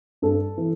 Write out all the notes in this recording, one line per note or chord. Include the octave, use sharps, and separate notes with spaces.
G2 A4
E3